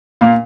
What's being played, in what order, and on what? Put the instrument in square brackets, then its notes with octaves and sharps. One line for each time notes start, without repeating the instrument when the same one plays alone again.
[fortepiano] A#2 [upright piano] F5